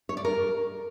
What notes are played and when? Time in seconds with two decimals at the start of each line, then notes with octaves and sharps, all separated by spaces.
0.09 C#5
0.17 D5
0.25 A#4